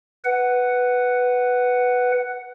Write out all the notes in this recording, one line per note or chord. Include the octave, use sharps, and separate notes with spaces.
B4 F#5